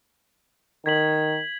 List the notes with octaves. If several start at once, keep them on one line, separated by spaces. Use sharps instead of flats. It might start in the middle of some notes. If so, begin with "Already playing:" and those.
D#3 G#6 B6 F#7